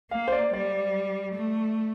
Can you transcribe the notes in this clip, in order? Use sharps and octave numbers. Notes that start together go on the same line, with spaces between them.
A#3 F5
C5
D5
G3 D5
A3